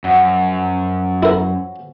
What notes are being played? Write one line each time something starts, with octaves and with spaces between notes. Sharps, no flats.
F#2 F3 C#4 F#4
E4 A#4